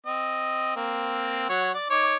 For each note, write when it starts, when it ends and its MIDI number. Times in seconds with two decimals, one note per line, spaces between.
0.06 0.72 60
0.06 0.72 75
0.76 1.46 58
0.76 1.46 60
1.49 1.72 54
1.49 1.72 73
1.49 1.72 78
1.75 1.89 74
1.90 2.16 63
1.90 2.16 73
1.90 2.16 86